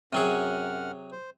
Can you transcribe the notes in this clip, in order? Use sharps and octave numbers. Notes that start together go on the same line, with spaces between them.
F#2 C3 F#3 G#4 F#5 F6
C5